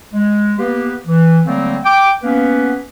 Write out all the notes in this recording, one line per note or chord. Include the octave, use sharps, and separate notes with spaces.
G#3
A#3 B3 G4 B4
E3
D3 F#3 G3 A3 A#3 C4
G5 D6
A#3 B3 C#4 B4